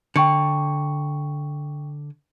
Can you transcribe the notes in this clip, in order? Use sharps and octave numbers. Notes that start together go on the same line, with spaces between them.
D3 G5 C#6 C#7